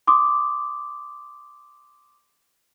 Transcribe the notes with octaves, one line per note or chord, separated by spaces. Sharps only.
C6 D6 D#6